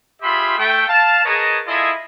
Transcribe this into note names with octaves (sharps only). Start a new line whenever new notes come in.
F4 G4 G#4 E5 B5 C6
A3 G5
F5 A5
G#4 A#4 B4 C#5 D#5 A5
E4 F4 G#4 A4 D#5 E5